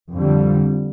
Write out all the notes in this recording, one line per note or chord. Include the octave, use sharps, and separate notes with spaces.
F2 D3 G3